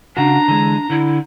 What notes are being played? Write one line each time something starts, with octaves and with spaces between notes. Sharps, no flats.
C#3 D4 F#4 A#5
D3 E3 G#3
D3 E4